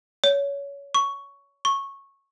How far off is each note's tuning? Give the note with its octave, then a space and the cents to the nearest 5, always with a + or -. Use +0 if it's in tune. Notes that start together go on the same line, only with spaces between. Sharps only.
C#5 +20
C#6 +10
C#6 -15